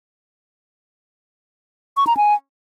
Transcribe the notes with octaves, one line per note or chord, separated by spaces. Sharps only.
C#6
A#5
G#5